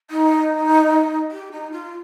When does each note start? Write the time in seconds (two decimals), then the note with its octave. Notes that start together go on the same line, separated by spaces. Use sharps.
0.11 D#4
1.31 G4
1.52 D#4
1.72 F4